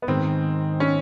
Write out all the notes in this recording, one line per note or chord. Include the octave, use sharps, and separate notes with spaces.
B3
G#2 D#3 G#3 C4
C#4